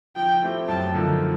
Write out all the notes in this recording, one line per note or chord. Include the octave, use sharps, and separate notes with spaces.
F3 G5
A3 C4 E4 G4
F#2 A5
D3 F3 A#3 D#4